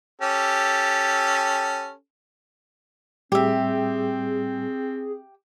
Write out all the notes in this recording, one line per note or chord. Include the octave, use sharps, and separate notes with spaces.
C#4 G4 A4
A2 G3 C4 G4 G#4 E5